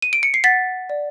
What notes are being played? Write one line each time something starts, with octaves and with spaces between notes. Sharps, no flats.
D#7
D7
C#7
C7
F#5 A6 B6
D5